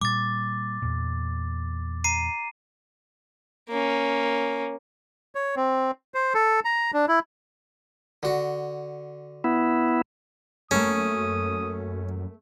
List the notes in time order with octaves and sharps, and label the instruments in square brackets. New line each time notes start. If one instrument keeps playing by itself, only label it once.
[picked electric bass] A#2 G3 [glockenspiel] D6 A6
[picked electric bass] E2 A#2
[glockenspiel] A#5 C7 D#7
[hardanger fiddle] A#3 C#4
[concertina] C#5
C4
C5
A4
A#5
D4
E4
[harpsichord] D3 F#4
[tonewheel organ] B3 E4
[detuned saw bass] F#2 [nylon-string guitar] A3 A#3 A4 [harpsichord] C#4 [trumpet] D#6